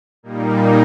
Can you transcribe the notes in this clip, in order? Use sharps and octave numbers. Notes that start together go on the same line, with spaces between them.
A#2 G3 A#3 D#4